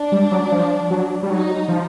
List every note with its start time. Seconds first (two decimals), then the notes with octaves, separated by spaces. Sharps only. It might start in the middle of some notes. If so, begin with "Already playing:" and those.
Already playing: D4
0.12 G3
0.31 F#3
0.52 F3
0.90 F#3
1.23 G3
1.29 F#3 D#4
1.68 F3